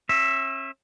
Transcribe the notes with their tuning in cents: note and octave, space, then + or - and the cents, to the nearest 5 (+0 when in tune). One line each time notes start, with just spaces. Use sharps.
C#4 -40 E5 +0